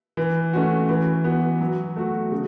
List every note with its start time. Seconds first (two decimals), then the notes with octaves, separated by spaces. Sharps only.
0.17 E3
0.53 A3 C#4 F#4
0.89 E3
1.24 B3 F#4
1.61 F#3
1.96 A3 F#4
2.32 C#3